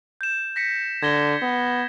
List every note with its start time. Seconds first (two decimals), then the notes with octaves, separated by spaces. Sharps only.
0.21 G6 E7
0.56 A#6 B6 C#7
1.02 D3 G#6 A#6 G7
1.42 B3